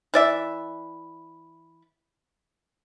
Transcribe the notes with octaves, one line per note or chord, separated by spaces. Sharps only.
E3 D5 E5